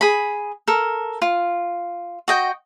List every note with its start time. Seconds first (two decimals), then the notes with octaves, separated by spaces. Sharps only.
0.01 G#4 B5
0.68 A4 A#4
1.22 F4
2.28 F#4 D#5 G5